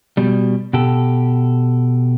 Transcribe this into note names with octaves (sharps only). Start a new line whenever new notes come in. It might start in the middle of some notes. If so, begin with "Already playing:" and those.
B2 G3
B2 G4 A4